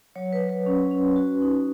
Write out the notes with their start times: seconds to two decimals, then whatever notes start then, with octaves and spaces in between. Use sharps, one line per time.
0.16 F#3 C#5
0.33 B4
0.41 F#3
0.49 B4
0.66 C#4
0.91 C#4
1.16 F#4
1.42 D#4